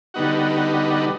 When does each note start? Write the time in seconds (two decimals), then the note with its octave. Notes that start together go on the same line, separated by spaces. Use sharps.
0.14 D3 G3 B3 D#4 F#4